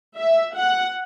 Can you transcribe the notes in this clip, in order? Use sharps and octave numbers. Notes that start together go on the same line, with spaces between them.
E5
F#5